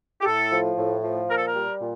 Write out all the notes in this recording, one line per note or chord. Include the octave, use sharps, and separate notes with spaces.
G4
A2 A4
F3
A2
F3
A#2 A#4
A4
A#4
G3
A#2